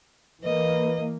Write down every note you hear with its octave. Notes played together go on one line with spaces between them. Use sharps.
E3 A#3 B4 D#5